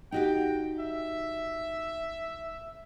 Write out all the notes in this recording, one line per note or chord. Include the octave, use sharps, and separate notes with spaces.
D#4 F#4 G4 G5
E5